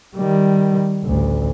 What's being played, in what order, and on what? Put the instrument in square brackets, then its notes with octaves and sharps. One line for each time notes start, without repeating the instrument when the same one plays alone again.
[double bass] D#3 G3
A1 D2